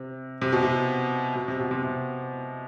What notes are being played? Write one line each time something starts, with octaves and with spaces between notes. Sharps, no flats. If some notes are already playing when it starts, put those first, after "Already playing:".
Already playing: C3
C3
B2
C3
B2
C3
B2
C3
C3